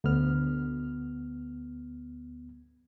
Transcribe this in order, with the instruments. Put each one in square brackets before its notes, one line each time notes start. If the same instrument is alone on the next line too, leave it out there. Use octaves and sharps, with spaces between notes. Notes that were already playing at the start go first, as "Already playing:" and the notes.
[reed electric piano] D2 B3 F6